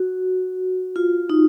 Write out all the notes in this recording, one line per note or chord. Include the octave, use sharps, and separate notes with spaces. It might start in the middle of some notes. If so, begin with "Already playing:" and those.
Already playing: F#4
F4
D#4